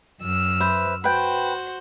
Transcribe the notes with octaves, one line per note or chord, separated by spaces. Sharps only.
F#2 E6 F6
B4 C5 E5
F#4 B4 C5 G5